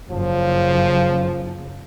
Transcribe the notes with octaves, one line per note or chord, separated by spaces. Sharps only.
F#1 F3